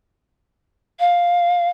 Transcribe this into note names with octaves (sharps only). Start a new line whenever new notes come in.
F5